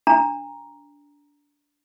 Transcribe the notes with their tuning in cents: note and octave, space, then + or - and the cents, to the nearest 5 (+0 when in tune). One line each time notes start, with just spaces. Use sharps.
D4 -20 A#5 +0